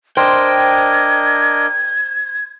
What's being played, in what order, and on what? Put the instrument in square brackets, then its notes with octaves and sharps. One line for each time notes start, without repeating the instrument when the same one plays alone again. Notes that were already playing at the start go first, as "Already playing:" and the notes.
[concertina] D4 A#4 D#5 [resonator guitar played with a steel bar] C5 [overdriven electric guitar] G5 [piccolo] G#6